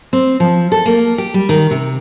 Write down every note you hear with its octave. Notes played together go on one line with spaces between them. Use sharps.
C4
F3
A4
A#3
G4
G3
D#3
C3